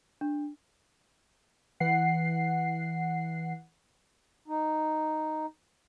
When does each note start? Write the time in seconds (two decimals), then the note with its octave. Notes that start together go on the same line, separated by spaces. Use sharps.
0.21 D4
1.80 E3 F#5 C7
4.48 D#4